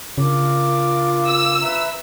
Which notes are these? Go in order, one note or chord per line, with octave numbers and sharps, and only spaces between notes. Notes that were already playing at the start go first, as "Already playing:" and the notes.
C#3 D4 F4 A#4 D6
E6
B4 E5 A#5